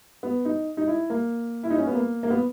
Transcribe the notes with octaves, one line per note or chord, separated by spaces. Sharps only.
B3
D#4
D#4
E4
A#3
E4
D#4
C#4
B3
A#3
A#3
B3